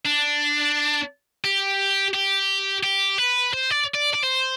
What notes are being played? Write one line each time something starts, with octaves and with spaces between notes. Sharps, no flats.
D4
G4
G4
G4
B4
C5
D5
D5
D5
C5